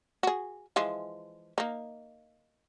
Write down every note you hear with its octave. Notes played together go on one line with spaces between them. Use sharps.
F#4 G#4
E3 F3 G#3
A#3 D#4